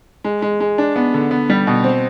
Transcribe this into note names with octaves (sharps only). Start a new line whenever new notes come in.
G#3
G#3
G#3
D4
B3
D3
B3
G3
B2
C4